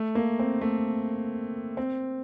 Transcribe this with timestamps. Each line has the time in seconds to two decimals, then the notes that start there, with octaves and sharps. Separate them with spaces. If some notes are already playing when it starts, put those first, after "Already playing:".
Already playing: A3
0.15 A#3
0.39 C4
0.61 A3
1.77 C4